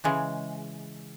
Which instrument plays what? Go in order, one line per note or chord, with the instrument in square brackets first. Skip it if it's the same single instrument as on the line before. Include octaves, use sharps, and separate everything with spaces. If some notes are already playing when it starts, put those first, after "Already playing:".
[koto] C#3 E3 G#3